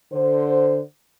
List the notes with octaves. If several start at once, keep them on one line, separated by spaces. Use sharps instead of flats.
D3 C5